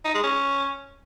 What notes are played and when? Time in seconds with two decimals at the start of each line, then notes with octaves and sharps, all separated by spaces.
0.05 D#4
0.14 G#3
0.24 C#4